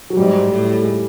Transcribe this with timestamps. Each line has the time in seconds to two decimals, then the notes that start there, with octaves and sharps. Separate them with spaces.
0.10 F#3
0.17 G#2 G3
0.50 A2
0.83 G#3